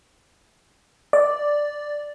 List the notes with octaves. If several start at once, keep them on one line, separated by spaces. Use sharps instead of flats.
D5